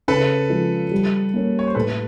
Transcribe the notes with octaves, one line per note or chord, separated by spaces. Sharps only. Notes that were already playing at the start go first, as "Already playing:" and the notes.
C#3 A4 B4
F3 G#3
G3
A#3 C#4
C#5
C5
A2 A4 B4